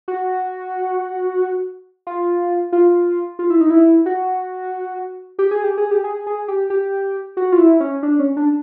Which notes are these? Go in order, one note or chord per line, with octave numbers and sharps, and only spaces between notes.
F#4
F4
F4
F4
E4
D#4
E4
F#4
G4
G#4
G4
G#4
G4
G#4
G#4
G4
G4
F#4
F4
E4
C#4
D4
C#4
D4